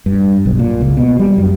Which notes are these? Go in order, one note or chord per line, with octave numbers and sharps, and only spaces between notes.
G2
B1
A#2
C#2
B2
G3
F#2